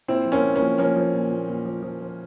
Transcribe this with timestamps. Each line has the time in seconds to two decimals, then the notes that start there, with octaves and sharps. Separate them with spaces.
0.08 A#2 C4 E4
0.25 F3
0.32 A#3 C#4
0.44 A#2
0.56 A#3 C#4
0.61 F3
0.78 F3 A#3 C#4
0.96 F3
1.14 A#2
1.31 A#2
1.48 A#2
1.65 F3
1.82 F3
2.00 F3